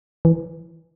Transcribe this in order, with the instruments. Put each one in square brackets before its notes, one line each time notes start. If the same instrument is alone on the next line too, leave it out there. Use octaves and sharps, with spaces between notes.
[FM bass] E3